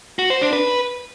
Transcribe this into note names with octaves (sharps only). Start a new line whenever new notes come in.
F#4
C5
D4
B4